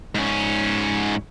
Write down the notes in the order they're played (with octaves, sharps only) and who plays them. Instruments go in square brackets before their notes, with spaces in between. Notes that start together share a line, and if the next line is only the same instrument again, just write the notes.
[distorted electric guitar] G#2 C#4